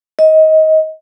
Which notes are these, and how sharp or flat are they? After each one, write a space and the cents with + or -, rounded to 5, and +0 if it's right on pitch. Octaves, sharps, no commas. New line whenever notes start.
D#5 +20